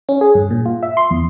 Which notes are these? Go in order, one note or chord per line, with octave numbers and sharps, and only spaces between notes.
C#4
G#4
G2
A#2
F4
E5
C6
E2